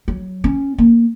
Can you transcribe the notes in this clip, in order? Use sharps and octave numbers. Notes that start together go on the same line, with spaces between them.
F#3
C#4
A#3